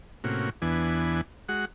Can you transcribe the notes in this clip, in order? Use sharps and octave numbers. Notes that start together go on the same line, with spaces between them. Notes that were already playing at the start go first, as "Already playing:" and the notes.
A2 C3 A#3 C#4 F#4
E2 E3 B3 D4 G#5
G#3 F#4 F#5